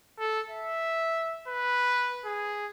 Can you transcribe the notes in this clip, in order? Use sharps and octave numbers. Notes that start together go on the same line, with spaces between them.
A4
E5
B4
G#4